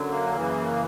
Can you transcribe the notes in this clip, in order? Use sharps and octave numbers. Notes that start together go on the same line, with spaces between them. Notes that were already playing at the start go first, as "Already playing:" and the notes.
Already playing: F#2 D3 F#3
A#3
F#2 C#3 E3